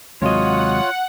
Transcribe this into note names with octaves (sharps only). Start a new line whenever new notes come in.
D#2 C3 F#3 G#3 F4 C#5 D#5 F#5